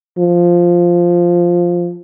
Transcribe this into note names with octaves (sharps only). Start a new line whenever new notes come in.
F3